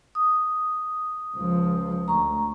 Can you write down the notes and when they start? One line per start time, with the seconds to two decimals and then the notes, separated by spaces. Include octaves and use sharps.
0.15 D#6
1.37 C#2 F3
2.08 D2 A#5 C#6